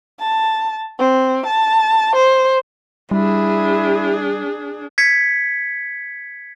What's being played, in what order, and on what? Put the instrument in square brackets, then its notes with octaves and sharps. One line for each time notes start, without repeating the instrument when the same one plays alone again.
[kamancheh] A5
C4
A5
C5
[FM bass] G3 [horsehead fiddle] D4 G#4 [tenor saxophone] E4
[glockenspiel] G#6 B6 C#7